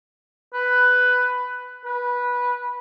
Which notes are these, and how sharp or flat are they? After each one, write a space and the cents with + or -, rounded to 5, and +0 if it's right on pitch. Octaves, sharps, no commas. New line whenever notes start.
B4 +10
B4 -15